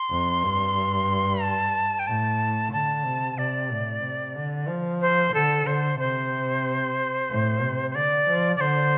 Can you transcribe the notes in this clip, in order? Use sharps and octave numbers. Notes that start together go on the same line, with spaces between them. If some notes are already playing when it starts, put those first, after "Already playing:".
Already playing: C6
F2
G2
A5
G5
A2 A5
D3 A5
C3
C3 D5
A2
C3
D3
F3
C5
D3 A4
D3 C5
C3 C5
A2
C3
C5
D3 D5
F3
D5
D3 C5